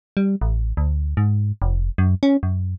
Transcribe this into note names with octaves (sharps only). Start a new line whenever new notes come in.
G3
A1
D2
G#2
F1
F#2
C#4
F#2